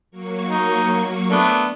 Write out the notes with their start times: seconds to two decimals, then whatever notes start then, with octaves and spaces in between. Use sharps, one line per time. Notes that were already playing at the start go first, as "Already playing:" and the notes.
0.11 F#3 A#3 C#6
0.48 D#4
1.30 A3 B3 D4